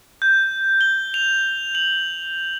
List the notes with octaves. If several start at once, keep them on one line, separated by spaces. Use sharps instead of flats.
G6
G7
F7
F#7